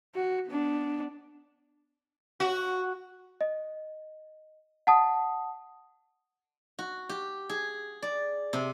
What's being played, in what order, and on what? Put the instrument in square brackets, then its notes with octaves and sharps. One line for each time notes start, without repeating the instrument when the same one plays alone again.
[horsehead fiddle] F#4
B3 D4
[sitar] F#4
[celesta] D#5
F#5 A5 D#6
[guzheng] F#4
G4
G#4
D5
C3